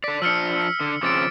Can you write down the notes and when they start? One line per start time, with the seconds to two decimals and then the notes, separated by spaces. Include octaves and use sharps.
0.04 A4 D5 B6
0.22 F3 D4 E6 F6 C#7
0.62 C#7
0.81 D3
1.03 C#3 F3 C4 D6 A6 D7